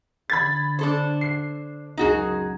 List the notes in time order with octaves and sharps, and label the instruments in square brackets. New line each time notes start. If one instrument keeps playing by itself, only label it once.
[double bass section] D3 [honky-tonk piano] B5 G#6 A6
[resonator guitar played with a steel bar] D4 A4 C5
[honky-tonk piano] C7
[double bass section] C#2 F#2 [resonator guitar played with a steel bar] D#4 F#4 G#4